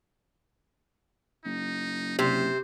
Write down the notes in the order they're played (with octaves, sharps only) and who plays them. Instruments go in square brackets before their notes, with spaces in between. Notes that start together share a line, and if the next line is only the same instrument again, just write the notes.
[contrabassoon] F#1 [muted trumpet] D#4
[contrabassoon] F#1 [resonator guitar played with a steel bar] C3 [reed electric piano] G4 [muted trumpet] C5